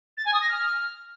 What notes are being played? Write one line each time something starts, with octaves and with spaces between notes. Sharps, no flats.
A6
G#5
D#6
A#6
F6